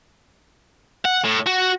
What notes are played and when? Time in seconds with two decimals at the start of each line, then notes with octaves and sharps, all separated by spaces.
1.05 F#5
1.25 A2
1.47 F#4